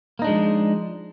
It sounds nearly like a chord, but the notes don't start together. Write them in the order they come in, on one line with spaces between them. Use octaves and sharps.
A#3 D#4 D4 G#3 F3